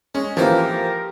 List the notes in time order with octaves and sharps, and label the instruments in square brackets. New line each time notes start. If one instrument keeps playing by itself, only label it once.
[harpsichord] G#3 [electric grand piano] C#4
[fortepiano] E3 A#3 F4 [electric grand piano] F3 [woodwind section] G4 A#4 [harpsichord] A4 C5